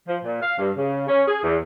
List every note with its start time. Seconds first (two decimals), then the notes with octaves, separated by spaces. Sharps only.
0.08 F3
0.24 A#2
0.42 F5
0.58 G2
0.77 C#3
1.08 C#4
1.28 G#4
1.44 E2